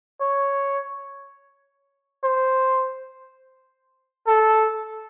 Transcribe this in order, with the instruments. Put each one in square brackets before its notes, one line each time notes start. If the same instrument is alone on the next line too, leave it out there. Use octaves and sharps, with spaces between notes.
[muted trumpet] C#5
C5
A4